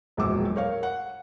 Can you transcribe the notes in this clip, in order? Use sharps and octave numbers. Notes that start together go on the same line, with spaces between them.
E1 A#1 A#2 F#3 D6 E6
A#4 C#5 F5
F#5